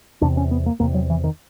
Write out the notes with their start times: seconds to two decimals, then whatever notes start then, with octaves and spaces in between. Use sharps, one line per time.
0.21 E2 C3 D4
0.37 C#4
0.51 B3
0.66 A#3
0.80 E2 C3 A#3
0.94 F#3
1.10 E3
1.24 D#3